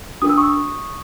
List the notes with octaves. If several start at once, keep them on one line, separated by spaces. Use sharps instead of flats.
D4 F#4 A#4 D#6
E6
C#6 D#6